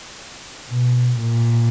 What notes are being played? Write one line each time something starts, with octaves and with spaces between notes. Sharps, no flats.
B2
A#2